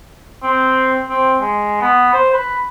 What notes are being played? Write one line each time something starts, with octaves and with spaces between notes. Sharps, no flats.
C4
C4
G#3
B3
C5
B4